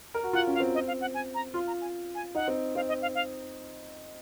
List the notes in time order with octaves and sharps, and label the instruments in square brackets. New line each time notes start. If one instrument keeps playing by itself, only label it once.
[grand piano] A#4
F#4
[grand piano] F4 [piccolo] F#5
[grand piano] C#4
[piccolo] F5
[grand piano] C4
[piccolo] D#5
F5
F#5
G#5
A#5
[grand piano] F4 [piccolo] C6
[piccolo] A#5
G#5
G#5
[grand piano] D#4 [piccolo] F#5
[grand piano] C4
[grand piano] C4 [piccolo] F5
[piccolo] D#5
F5
F5